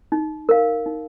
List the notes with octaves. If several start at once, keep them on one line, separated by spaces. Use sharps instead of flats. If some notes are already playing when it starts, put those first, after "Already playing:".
D#4
A#4 F5
D#4